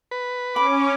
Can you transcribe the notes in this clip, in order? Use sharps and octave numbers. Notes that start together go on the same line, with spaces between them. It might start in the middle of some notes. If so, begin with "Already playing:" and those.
B4
C#4 B5 D6